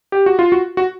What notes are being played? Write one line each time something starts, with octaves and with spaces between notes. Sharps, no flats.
G4
F#4
F4
F#4
F#4